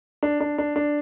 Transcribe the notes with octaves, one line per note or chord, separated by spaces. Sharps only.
D4
D4
D4
D4